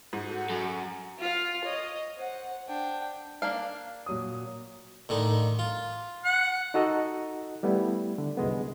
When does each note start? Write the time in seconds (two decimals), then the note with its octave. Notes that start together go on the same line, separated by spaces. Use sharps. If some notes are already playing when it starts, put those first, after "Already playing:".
0.13 G#2 F#4 A4 F#5
0.50 F#2
1.18 F4 F5
1.64 C#5 D#5
2.16 C5 F#5
2.68 D4 G5
3.42 A#3 D4 F5
4.06 A#2 F#3 D#6
5.09 A2 D3 D#3
5.59 F4
6.23 F#5
6.74 D#4 F#4 A4 D#5 A#5
7.63 G3 A3 B3 E4
8.18 D3
8.37 C2 F#2 G#3 B3